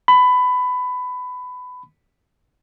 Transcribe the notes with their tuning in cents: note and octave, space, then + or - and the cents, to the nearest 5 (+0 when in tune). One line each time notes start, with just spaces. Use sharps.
B5 +20